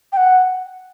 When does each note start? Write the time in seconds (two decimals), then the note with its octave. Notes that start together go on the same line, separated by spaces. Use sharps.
0.13 G5
0.17 F#5